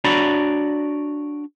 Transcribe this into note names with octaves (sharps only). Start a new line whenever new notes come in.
D4 F#4 C#5 D5 A#5 B5